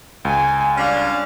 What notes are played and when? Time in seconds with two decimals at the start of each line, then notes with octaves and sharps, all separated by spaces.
0.25 C#2 G#5
0.77 G3 C#4 D4 F5